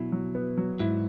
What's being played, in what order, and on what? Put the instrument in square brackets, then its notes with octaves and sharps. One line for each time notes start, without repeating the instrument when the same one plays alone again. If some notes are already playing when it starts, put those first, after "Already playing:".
Already playing: [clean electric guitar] B2 [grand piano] F#3 E4
[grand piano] F#3
B3
F#3
[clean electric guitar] G#2 [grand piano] E4